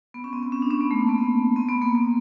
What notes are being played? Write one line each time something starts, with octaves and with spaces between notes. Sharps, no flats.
B3
C#4
C4
B3
C#4
D4
C#4
B3
A3
A#3
B3
C4
C4
B3
A#3
B3